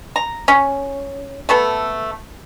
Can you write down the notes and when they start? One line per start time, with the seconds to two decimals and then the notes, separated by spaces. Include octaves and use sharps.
0.16 A#5
0.48 C#4
1.49 A3 B3 A4